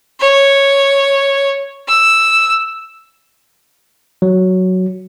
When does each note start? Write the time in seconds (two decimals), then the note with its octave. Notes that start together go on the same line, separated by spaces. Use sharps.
0.20 C#5
1.88 E6
4.22 F#3